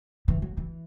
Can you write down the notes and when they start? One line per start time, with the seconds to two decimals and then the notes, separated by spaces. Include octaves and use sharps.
0.28 E3
0.42 F#3
0.57 E3